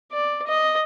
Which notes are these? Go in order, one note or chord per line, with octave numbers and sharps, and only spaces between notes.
D5
D#5